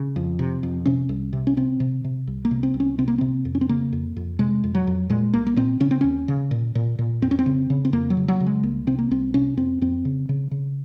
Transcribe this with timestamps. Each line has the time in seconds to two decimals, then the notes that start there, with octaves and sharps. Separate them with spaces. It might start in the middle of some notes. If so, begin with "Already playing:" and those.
Already playing: C#3
0.16 F2
0.39 C3
0.63 F2
0.86 C3 C#4
1.09 C2
1.33 C3
1.47 C#4
1.57 C3 C4
1.80 C3
2.04 C3
2.27 C2
2.45 A#3
2.51 C3
2.63 C4
2.74 C2
2.80 C#4
2.98 C3 C4
3.08 A#3
3.18 C3 C4
3.45 F2
3.55 C#4
3.61 C4
3.69 C#3 A#3
3.93 F2
4.16 F2
4.39 C3 G#3
4.64 F2
4.75 F#3
4.87 F2
5.10 A#2 G#3
5.33 C2 A#3
5.47 A#3
5.56 A#2 C4
5.80 C#3 C#4
5.91 C4
6.01 D#2 C#4
6.28 C#3
6.51 A#2
6.75 A#2
6.99 A#2
7.22 F2 C4
7.31 C#4
7.39 C4
7.46 C#3
7.70 C#3
7.85 C4
7.93 F2 A#3
8.10 F#3
8.17 C#3
8.28 F#3
8.40 C#3
8.46 G#3
8.63 C2 A#3
8.87 C3 C4
8.99 A#3
9.11 C2 C4
9.34 C3 C#4
9.57 F2 C4
9.81 F2 C4
10.05 C#3
10.29 C#3
10.51 C#3